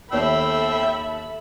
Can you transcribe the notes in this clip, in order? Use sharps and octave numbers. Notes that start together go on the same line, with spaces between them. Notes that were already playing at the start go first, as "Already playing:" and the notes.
D#2 A4 C#5 E5 G5 B5 E6